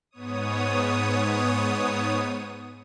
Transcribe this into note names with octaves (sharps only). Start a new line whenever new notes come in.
G#2 B3 C#5 D#6